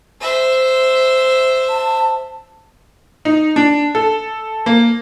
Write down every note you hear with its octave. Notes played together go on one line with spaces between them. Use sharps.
C5 E5
A5
D#4
D4
A4
A#3